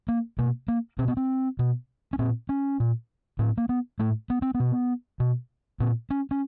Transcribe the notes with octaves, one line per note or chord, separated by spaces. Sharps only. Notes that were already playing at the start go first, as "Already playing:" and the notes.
A#3
B2 A#3
A#3
B2 C4
B3
C4
B2
C#4
A#2 C4
C#4
A#2
A2 C4
A#3
B3
A2 A3
B3
C4
B3
B2
B2
A#2 C4
C#4
C#4